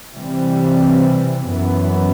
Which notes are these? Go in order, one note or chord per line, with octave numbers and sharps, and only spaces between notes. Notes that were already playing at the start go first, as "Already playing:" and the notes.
C3 E3 G3 C4
F#2 E3 B3